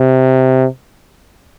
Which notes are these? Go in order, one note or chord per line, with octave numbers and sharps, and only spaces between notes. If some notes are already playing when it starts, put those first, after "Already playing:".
Already playing: C3